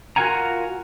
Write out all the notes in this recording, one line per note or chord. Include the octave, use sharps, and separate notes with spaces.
F4 F#4 A#4 F#5 G#5 A#5